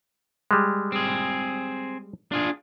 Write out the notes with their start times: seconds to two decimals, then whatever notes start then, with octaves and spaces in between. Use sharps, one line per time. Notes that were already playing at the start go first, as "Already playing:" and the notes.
0.51 G3 G#3
0.92 C4 G#4
2.32 D4 F4 G#4